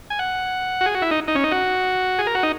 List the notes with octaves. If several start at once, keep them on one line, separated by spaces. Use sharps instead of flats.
G#5
F#5
F#4
G#4
F#4
E4
D#4
D#4
C#4
D#4
F#4
G#4
A#4
F#4
D#4